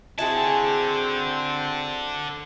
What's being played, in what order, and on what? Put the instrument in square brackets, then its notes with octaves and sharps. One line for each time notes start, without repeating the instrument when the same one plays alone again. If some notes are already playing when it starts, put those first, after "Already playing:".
[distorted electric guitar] D3 A5 [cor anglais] C4 [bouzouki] E4 F#4 G#4